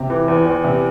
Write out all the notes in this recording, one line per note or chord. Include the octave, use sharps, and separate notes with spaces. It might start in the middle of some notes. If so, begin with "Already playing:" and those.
Already playing: C3 G4
E3
E2
E2
C3